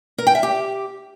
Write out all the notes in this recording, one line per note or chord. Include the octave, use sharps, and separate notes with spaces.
A#4
G5
E5
G4